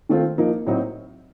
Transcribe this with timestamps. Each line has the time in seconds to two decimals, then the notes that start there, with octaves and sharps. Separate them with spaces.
0.09 D#3 A3 C4 F4
0.38 F3 A#3 D#4
0.66 A2 F#3 C4 D#4